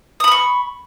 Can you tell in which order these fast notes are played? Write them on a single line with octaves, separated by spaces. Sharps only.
D#6 B5 F6 C#6